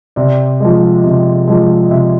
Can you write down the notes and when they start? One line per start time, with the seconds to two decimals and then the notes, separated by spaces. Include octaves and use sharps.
0.16 C3 D5
0.60 F3 G#3
1.04 C3
1.48 F3 G#3
1.90 C3 E5